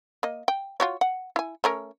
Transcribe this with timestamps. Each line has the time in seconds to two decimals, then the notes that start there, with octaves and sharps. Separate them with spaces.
0.23 A#3 D#5
0.48 G5
0.80 F4 F#4 C#5
1.01 F#5
1.36 E4 G#5
1.64 A3 C#4 A#4